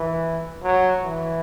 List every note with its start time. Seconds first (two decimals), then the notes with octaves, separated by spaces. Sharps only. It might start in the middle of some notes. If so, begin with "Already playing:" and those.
Already playing: E3
0.63 F#3
1.03 E3